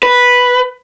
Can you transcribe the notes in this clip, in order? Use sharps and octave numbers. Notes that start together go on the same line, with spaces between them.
B4